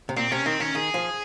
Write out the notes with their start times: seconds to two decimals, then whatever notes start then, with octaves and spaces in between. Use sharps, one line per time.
0.09 C3
0.16 A#2 C4
0.31 C3 C#4
0.46 D#3 C4
0.60 D#3 C#4
0.75 D#3 G#4
0.94 F3